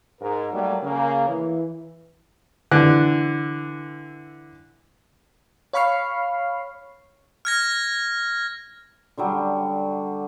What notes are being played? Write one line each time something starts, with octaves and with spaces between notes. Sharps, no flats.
G#2 A#4
F#3 G3 A3 A#3
C#3 A#3
E3
D3 E3 F#6
C#5 F5 B5 C#6 F6 C7
F6 G#6 A#6
D3 F#3 G3 D4